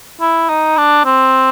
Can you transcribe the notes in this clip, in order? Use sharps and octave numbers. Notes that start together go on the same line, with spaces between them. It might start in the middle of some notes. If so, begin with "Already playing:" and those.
E4
D#4
D4
C4